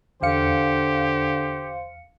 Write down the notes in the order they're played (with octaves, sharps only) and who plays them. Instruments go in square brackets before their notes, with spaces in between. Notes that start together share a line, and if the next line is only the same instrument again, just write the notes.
[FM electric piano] E2 F5 C#7 [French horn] D3 [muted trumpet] G4 [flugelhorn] C5